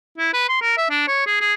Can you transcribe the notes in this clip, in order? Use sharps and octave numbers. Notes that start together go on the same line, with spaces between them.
E4
B4
C6
A#4
E5
D4
C#5
G#4
G#4